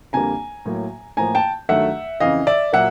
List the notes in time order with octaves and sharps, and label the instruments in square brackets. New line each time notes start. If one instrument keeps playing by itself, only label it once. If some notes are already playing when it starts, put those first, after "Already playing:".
[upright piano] F2 D3 G3 A#3 G#5 A#5
A2 F#3 A#3
A2 F3 A#3 G#5 A#5
G5 A5
G2 D#3 F#3 A3 E5 F#5
F2 C#3 E3 D#5 F5
D5 E5
A#2 F#3 A#3 E5 F#5